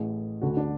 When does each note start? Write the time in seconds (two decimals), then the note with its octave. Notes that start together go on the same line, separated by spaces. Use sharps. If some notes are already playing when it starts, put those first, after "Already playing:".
Already playing: A1 A2 E3 G#4
0.41 D2 D3 F#4
0.57 D4